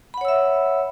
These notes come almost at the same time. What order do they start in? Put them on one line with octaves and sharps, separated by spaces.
B5 F#5 C#5 E6 E5